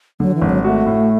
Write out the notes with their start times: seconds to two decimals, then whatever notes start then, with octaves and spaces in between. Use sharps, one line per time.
0.20 D3 F#3
0.35 E3
0.41 G#1
0.49 F#3
0.64 A3 F#4
0.86 A2